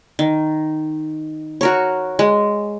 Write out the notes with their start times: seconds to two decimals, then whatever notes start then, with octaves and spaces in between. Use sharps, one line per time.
0.19 D#3
1.61 F#4 A#4 C#5
2.19 G#3